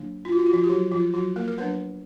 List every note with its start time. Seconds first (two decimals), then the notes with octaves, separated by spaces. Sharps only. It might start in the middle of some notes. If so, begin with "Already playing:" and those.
Already playing: D3 F#3 A#3 D4
0.25 F4
0.32 F#4
0.39 F4
0.46 F#4
0.53 F3 F4
0.64 G4
0.69 F#3 F#4
0.91 F3 F4
1.14 F#3 F#4
1.36 A#3 A#4
1.48 A#4
1.58 F#3 B3 D4 B4